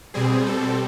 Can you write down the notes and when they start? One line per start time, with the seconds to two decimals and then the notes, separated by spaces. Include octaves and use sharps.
0.14 B2 G3 C4 G#4
0.47 A4